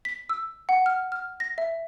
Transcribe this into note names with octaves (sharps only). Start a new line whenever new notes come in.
B6
E6
F#5
F6
F6
A#6
E5